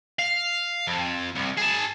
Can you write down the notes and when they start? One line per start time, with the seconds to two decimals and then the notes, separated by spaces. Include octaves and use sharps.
0.19 F5
0.87 F2
1.36 C2
1.58 G#4 A5